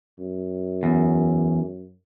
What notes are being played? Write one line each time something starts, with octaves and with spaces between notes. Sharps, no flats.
F#2
E2